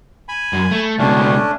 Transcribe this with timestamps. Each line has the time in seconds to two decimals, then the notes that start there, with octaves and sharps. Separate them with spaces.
0.28 G#5 B5
0.53 F#2
0.71 A3
0.99 C#2 B2 A3 C#4 D4